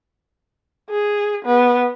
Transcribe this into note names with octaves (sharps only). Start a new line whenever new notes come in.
G#4
B3